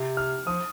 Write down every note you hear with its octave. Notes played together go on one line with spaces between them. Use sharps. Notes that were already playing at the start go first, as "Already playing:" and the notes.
Already playing: C3
F6
F3 D#6